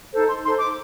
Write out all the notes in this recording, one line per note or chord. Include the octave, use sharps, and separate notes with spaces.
D#4 A4 C5
C6
D#4 A4 C5 C6
D6